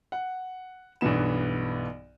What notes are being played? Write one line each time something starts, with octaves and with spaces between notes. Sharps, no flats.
F#5
B1 G2 E3 B3 E7